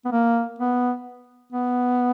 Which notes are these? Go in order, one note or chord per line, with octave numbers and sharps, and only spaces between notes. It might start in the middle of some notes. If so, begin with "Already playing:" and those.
B3
A#3
B3
B3